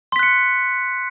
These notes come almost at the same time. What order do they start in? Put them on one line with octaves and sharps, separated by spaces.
C6 B6 F#6 C#7